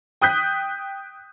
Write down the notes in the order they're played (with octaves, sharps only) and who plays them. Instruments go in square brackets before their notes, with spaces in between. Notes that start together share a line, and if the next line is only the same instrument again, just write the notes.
[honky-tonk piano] G5 D#6 F#6 G6 B6